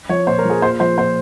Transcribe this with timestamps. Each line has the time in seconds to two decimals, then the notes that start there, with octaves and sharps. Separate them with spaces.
0.09 F3 C#5
0.27 A#2 C5
0.38 A#4
0.44 F3
0.50 G#4
0.62 A#2 C5
0.80 F3 C5
0.98 A#2 C5